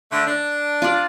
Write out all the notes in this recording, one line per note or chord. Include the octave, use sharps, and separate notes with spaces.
D3 A3
D4
F4 D5